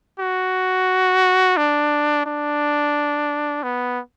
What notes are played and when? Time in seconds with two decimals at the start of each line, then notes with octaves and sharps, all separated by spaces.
0.19 F#4
1.57 D4
2.26 D4
3.63 B3